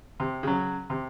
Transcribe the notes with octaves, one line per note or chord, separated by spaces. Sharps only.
C3
C#3 F#3
C3